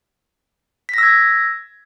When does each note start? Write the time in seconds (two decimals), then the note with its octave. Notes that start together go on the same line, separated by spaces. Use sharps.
0.89 B6
0.94 A#6
0.98 E6
1.03 G#6